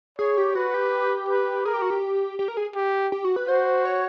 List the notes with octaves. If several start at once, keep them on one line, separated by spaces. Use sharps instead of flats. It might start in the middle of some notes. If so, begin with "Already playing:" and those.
G#4 C#5
G4
F#4 B4
G4
B4
G#4 A#4
G4
F#4
G4
G4
A#4
G#4
G4
G4
F#4
B4
F#4 C5
C#5